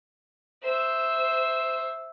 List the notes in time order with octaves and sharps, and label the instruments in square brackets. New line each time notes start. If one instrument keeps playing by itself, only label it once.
[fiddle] C5 E5